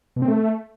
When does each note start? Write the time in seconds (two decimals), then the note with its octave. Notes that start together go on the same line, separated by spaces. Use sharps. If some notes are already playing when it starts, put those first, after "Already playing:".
0.16 B2
0.22 C4
0.28 A3